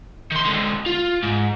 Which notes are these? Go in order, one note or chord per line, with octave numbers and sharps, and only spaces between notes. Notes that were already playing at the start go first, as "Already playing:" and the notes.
D#3 C6
D3 G#3
F4
G#2